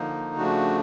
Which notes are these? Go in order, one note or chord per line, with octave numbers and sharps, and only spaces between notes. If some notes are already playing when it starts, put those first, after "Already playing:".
Already playing: D3 F3 A#3 D#4
C#3 F3 A3 D4 F#4